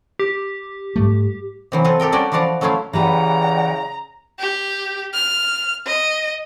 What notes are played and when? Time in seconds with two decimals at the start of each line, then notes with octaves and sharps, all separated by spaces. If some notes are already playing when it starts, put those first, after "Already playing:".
0.19 G4
0.96 G#2 G3 A3
1.72 C3 E3 F#3
1.84 C4 F4 A4 B4
2.00 G4 A4 A#4 G5
2.12 G3 C#4 F#4 D5 G5
2.32 E3 F3 F#4 D5 F5 F#5
2.61 F#3 A3 C#4 E4 F4 F5
2.93 C#3 E3 G4 B4 D5 F#5 G5 A#5
4.39 G4
5.13 F6
5.86 D#5